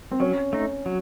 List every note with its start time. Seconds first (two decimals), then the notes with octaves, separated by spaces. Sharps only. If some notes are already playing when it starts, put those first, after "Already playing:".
0.11 C4
0.20 F#3 C#4
0.53 A3 D#4
0.86 F#3